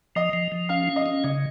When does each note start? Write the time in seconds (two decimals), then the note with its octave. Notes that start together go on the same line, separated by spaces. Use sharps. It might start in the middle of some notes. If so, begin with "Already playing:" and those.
0.16 F3 D#5
0.33 F3
0.52 F3
0.69 C#4 F5
0.87 C#4
0.96 D#5
1.06 C#4
1.24 C#3 D#5